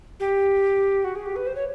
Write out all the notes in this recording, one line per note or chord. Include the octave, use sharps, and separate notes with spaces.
G4
F#4
G#4
G4
B4
C5
C#5